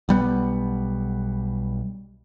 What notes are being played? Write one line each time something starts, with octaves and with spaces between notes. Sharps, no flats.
B1 G3 B3